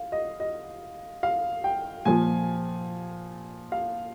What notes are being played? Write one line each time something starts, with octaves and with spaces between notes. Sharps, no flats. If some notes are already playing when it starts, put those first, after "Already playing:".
Already playing: F5
D#5
D#5
F5
G5
A#2 F3 G#5
F5